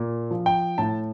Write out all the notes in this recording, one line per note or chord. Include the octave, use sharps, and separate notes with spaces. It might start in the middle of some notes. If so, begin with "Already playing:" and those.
Already playing: A#2
F3
G5
A2 A5